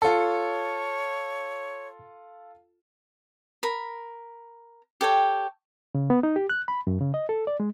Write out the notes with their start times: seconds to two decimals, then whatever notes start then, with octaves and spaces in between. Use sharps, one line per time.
0.02 F4 A4 C#5 A5
3.63 A#4 B5
5.01 G4 A4 C#5 G5
5.95 C#3
6.10 B3
6.23 D#4
6.36 G4
6.50 F#6
6.68 B5
6.87 F#2
7.01 C#3
7.14 D#5
7.29 A4
7.47 D5
7.60 G#3